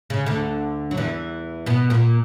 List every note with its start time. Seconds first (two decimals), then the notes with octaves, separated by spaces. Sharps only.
0.10 C#3
0.26 D2 D3
0.91 F#3
0.97 E2 E3
1.66 B2 B3
1.90 A#2 A#3